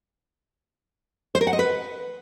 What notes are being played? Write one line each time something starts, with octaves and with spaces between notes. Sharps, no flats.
C5
A#4
F#5
D#5
B4